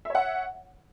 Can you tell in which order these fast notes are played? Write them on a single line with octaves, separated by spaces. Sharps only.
E5 C#5 F#5